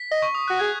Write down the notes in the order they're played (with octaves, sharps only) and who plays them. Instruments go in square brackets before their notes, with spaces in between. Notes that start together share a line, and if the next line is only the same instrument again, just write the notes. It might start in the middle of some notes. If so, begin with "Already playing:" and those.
Already playing: [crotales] B6
[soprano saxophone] D#5
[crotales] C#6
D#6
[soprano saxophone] F#4 [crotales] F#6
[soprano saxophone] G#4 [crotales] G#6